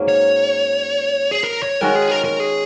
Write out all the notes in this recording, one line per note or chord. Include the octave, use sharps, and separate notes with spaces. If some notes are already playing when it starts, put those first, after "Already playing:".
Already playing: G#2 F#3 A#3 C#4
C#5
G#4
A#4
C#5
D#3 G#3 C#4 F#4 A#4
G#4
A#4
A#4
G#4